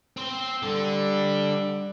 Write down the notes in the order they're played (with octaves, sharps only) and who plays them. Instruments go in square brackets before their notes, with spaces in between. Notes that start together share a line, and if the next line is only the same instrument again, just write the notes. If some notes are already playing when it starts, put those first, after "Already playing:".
[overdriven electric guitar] C4 C5
[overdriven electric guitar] D3 [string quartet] G3